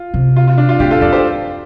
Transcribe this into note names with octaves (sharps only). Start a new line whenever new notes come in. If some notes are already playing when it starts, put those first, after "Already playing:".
Already playing: F4
C3
F4
F4
D4
F4
A2 D4 G4
F4 A4
F2 A4 D5
G4 C5